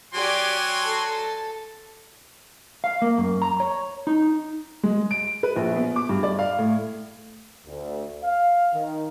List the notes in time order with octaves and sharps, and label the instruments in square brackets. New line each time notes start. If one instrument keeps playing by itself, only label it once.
[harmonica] F#3 G#5 C6 [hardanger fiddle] G4 D5
[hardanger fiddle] A4 A5
[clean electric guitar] F5
A#3
F#2
A#5
C#5
D#4
[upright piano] G#3
D7
B4
A#1
B3
D6
G2
D5
F5
A2
[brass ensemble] D2
F5
D#3